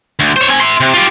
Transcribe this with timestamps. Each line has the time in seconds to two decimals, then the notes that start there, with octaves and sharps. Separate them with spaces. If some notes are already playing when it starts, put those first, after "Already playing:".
0.19 D2
0.36 C5 C#5
0.48 C4 G#5
0.60 E5 C6
0.80 C3
0.93 F4 G4